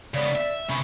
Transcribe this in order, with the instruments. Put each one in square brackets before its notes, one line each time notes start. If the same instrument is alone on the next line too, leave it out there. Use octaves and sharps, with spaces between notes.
[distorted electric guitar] C#3 B3 [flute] D5
[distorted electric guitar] E5
[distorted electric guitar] C3 C#4 [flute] B5